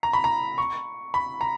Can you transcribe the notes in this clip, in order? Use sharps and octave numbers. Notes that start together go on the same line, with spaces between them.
A#5
B5
A#5
C#6
B5
A#5